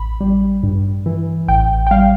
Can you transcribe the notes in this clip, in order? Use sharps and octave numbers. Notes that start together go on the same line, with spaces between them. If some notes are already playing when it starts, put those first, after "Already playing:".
Already playing: A1 B5
G3
G2
E3
A1 G5
G5
G3 F5